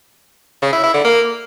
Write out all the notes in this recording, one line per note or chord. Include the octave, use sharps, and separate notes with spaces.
C#3
E4
E4
D3
A#3